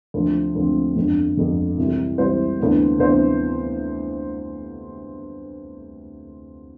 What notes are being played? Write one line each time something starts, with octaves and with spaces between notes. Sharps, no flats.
D2 C3 F3 C4
D2 C3 F3 C4
G1 F2 D3
G1 F2 D3
C2 C3 E3 G3
C2 C3 E3 G3 C5
D2 C3 E3 B3
D2 C3 E3 B3 C5